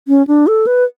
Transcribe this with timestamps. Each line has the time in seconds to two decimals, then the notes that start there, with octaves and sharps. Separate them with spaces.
0.08 C#4
0.27 D4
0.47 A4
0.67 B4